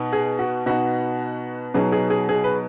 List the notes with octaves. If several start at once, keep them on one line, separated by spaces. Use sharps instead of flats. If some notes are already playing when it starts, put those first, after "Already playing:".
Already playing: B2 B3 D#4
G#4
F#4
B2 B3 D#4 F#4
B2 F#3 B3 D#4 G#4
G#4
G#4
G#4
B4